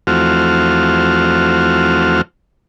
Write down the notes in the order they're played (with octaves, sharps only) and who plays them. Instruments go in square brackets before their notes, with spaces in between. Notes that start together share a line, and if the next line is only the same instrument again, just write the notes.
[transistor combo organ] E2 F3 A3 C4 F#4 F6